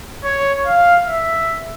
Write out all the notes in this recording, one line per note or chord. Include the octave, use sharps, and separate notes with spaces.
C#5
F5
E5